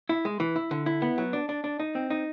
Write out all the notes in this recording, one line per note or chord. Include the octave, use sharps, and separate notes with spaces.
E4
G#3
E3
E4
D3
E4
B3
F#3
D4
D4
D4
D#4
C4
D#4